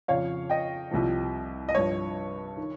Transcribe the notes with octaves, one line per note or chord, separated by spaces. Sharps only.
F2 C#3 F3 C#5 F5
D#5 G5
C2 C3 F3
D#5
G2 F3 C#5
D#3